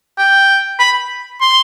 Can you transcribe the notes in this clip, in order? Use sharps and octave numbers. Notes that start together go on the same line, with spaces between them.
G5
B5
C6